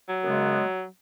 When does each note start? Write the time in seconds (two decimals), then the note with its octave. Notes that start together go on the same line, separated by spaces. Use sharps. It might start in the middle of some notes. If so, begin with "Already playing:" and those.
0.09 F#3
0.24 F#2 C#3 G#3 B3